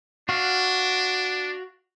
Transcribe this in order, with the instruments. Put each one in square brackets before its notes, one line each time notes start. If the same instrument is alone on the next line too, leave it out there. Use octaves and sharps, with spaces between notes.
[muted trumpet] D4 [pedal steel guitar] F#4 F5